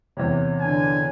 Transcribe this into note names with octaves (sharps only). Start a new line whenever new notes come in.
E2 C3 C#5
D3 G#5